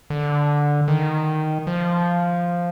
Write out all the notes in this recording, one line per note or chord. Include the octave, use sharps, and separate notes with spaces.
D3
D#3
F3